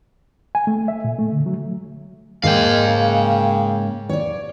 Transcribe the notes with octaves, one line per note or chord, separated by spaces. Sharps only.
G#5
A3
E5
A#2
A3
D3
F#3
G#2 G#3 A#3 F5 G5
C#3
C#5 D5